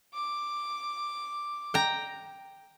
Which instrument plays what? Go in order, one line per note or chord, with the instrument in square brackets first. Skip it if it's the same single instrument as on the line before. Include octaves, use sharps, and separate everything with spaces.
[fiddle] D6
[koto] G5 A#5